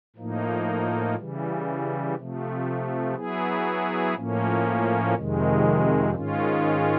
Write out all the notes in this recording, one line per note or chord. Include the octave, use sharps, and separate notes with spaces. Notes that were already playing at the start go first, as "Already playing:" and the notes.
A2 F3 A#3 D#4
C#3 E3 G3
C3 F3 A3
F#3 B3 E4 G#4
A2 F3 A#3 C#4
F2 C3 D#3 G#3
G#2 D#3 G#3 C#4 F4